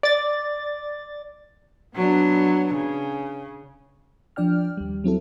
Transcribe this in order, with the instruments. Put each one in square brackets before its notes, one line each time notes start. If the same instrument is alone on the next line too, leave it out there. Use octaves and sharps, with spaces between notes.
[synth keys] D5 A6
[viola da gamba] F#3 B3 D4
C#3
[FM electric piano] F3 D4 D5 G5 F6
D#2 G3
F#3 C4 E4 A4